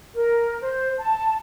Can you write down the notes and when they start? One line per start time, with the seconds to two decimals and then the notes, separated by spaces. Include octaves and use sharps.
0.15 A#4
0.62 C5
0.99 A5